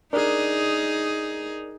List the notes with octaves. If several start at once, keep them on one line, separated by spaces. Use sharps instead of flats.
D4 D#4 G#4 A#4